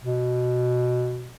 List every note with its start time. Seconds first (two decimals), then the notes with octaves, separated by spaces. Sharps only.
0.03 B2